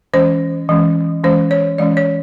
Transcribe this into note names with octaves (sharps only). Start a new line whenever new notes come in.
E3 G#3 C#4 C5
E3 G#3 C#4
E3 G#3 C#4 C5
C#5
E3 G#3 C#4 D5
C#5